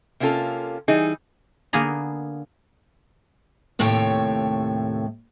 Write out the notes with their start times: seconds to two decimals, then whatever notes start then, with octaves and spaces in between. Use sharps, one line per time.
0.20 C3 A#3 C#4 F4 A4
0.88 E3 G3 D#4 G#4
1.73 D3 A#3 B3 G#4 A#5
3.79 D#2 A2 C3 A3 C#5 G5